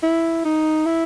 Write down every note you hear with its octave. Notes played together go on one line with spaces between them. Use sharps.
E4
D#4
E4